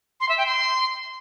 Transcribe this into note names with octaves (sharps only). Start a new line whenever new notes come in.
C6
E5
G5
C6